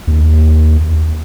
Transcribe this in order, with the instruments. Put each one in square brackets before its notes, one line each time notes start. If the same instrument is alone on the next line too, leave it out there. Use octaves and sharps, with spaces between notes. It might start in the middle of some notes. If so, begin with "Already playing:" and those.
[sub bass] D#2